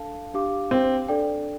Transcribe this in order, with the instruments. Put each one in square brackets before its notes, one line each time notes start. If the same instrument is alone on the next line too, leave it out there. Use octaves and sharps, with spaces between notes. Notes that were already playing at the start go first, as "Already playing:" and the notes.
Already playing: [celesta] D4 A4 F5 A5
D4 G4 F5 D6
[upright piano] C4
[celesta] D4 A4 D5 G5